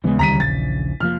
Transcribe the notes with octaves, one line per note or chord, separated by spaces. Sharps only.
D#2 C#3 E3 G3 G#3 B3
D2 D#3 G3 A#5 B6 D#7
A#1 A6
F1 F3 A#3 F6